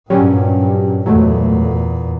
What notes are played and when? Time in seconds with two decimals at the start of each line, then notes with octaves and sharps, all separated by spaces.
0.10 G2 A#2 F#3 G3 C#4
1.06 E2 A#2 F#3 G#3 A3